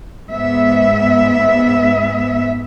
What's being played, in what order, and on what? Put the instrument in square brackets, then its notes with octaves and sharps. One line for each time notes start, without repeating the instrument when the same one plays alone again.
[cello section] G#2 G#3 B3 E5